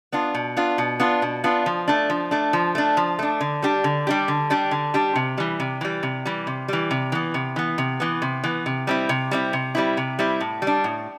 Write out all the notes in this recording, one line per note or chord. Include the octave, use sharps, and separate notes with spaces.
B3 D4 F4
B2
B3 D4 F4
B2
B3 D4 F4
B2
B3 D4 F4
F3
A3 D4
F3
A3 D4
F3
A3 D4
F3
A3 D4
D3
G3 D4 G4
D3
G3 D4 G4
D3
G3 D4 G4
D3
G3 D4 G4
C3
E3 G3
C3
E3 G3
C3
E3 G3
C3
E3 G3
C3
E3 B3
C3
E3 B3
C3
E3 B3
C3
E3 B3
C3
G3 C4 E4
C3
G3 C4 E4
C3
G3 C4 E4
C3
G3 C4 E4
A2
G3
D4
A2